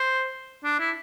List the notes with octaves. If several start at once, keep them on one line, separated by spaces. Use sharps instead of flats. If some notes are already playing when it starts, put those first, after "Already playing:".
Already playing: C5
D4
E4